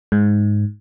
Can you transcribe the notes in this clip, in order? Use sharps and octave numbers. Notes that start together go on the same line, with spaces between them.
G#2